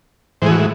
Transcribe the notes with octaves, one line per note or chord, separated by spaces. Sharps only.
A2 E3 G#3 G#4 C5
F#4